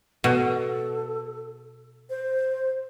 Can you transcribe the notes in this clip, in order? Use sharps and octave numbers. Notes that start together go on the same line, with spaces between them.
B2 A4
C5